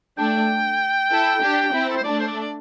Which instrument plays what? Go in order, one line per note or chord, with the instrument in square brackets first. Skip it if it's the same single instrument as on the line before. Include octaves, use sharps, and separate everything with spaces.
[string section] A3 D4 [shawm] G5
[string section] E4 A4
D4 G4
C4 E4
[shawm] A4
C5
[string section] A3 D4 [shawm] D5
[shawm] C5
D5
D5